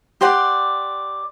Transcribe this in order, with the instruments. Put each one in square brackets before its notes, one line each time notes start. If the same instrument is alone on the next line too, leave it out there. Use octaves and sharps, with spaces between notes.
[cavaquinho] G4 C5 D5 F#5